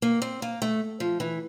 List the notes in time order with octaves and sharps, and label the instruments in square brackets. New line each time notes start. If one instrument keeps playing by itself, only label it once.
[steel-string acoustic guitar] A#3
C4
A#3
A3
F3
E3